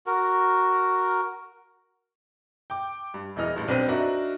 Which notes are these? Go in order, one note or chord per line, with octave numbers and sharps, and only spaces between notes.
F#4 A#4
G5 D6
G2
E1 E2 E3 D#5 F6
A1 G2
B1 C4 D4 B4 C5 D#7
D4 D#4 F#4 A#4 E5